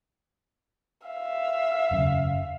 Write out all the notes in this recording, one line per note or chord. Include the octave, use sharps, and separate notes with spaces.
E5 F5
E1 F#2 C#3